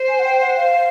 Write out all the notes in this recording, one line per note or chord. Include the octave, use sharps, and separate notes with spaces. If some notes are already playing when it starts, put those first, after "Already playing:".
Already playing: C5
G#5
F#5
G5
F#5
F5